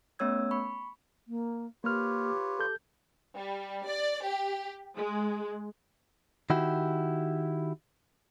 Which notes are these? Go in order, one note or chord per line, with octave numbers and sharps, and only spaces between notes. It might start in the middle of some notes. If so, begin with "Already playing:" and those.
A3 B3 C#4 C#5 E6 G#6
B5 C#6
A#3
A#3 F4 G4 B4 C#5 F6
A4 G6
G3
D5
G4
G#3
D#3 E4 F#4 G4